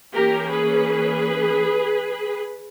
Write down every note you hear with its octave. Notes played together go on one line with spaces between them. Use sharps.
E3 A#3 C#4 G4 A#4
G#4 B4